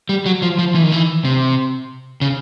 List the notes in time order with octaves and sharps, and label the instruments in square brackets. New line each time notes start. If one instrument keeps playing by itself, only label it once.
[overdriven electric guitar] G3
F#3
F3
F3
E3
D#3
E3
C3
C#3